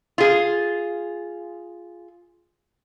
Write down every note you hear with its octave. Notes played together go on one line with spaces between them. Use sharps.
F4 G#4